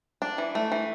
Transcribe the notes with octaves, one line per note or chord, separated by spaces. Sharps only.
D4
E3
A3
E3